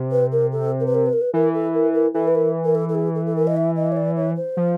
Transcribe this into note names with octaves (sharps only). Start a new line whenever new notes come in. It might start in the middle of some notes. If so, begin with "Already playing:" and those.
Already playing: C3
B4
A#4
A4
A#4
B4
A#4
B4
A#4
B4
E3 A#4
A4
A#4
A#4
E3 A4
B4
A#4
A#4
A4
A4
G#4
A4
A4
A#4
D#5
E5
D#5
C#5
D5
C#5
C5
F3